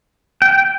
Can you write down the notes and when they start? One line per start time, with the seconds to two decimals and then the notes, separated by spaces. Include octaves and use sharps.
0.42 G5